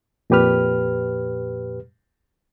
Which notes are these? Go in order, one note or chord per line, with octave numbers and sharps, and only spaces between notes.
F2 A#2 G4 B4 F6